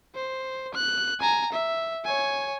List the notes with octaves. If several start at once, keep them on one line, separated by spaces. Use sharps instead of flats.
C5
F#6
G#5 A#5
E5
C#5 G#5